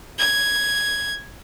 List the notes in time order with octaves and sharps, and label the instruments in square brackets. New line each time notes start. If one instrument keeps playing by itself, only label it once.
[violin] G#6